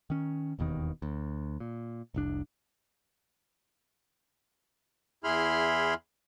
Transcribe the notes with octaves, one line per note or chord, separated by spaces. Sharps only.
D#3 C#4
E1 D#2 B2 D#3
D2
A#2
F1 C2 D4
E2 E4 G#4 B5 C6 F6